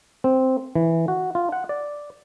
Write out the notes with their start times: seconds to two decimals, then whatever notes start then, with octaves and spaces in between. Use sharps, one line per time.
0.24 C4
0.75 E3
1.08 F#4
1.35 F4
1.52 F#5
1.69 D5